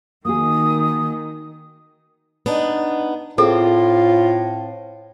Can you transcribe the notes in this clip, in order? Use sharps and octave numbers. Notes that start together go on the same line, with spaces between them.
D#3 A#3 F#4 G#4 D#6
B3 D4 D#4
A2 C4 F4 G#4 A4